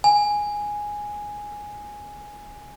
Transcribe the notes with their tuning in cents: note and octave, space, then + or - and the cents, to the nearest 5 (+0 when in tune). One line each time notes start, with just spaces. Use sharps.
G#5 +0